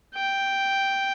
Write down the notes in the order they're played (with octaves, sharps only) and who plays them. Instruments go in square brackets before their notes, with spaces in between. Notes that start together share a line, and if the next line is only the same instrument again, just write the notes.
[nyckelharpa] G5